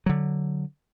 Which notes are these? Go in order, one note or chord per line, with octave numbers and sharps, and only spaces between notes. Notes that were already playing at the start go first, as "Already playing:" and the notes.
D3 F#3